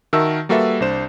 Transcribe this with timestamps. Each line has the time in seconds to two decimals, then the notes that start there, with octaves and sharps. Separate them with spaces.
0.13 D#3 F#4 A#4 E5 A5 E6
0.49 G3 A#3 F#4 A4 B4 E5
0.80 C2 D4 C5 E7